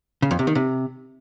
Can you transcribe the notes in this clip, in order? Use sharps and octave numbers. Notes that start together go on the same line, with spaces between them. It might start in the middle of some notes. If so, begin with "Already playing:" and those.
C#3
F2
C3
D#3
C3